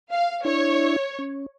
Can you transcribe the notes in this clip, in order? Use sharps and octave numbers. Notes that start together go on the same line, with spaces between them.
F5
D4 E4 C#5
C#4